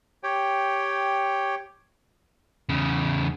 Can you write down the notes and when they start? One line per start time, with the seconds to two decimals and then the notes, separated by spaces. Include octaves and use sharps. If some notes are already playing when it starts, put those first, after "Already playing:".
0.23 G4 C#5 G5
2.69 E2 C#3